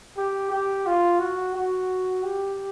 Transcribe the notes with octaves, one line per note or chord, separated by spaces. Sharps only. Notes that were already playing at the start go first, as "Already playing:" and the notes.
G4
G4
F4
F#4
F#4
G4